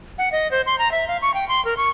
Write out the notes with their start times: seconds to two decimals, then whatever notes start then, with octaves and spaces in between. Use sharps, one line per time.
0.18 F#5
0.32 D#5
0.51 C5
0.66 C6
0.79 A#5
0.92 E5
1.08 F5
1.22 C#6
1.34 G5
1.49 C6
1.65 A#4
1.77 C#6